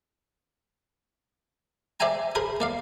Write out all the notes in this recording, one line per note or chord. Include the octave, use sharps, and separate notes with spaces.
C5 D5 E5 G5 G#5 A#5
G#4 A#4 C5 B5
A#3 D5 F5